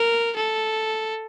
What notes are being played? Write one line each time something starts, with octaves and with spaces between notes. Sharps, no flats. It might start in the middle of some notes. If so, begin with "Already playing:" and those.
Already playing: A#4
A4